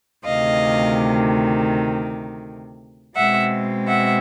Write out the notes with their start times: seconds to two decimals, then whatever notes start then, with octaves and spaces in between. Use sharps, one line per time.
0.25 D2 C3 D#3 D#5 F5
3.16 B2 G#3 C4 E5 F#5
3.88 E5 F#5